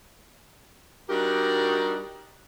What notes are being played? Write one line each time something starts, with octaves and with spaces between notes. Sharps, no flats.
G3 D4 D#4 F#4 G4 A#4